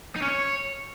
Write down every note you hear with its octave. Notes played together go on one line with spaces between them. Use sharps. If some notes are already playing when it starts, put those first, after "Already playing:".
D#4
C#4
C#5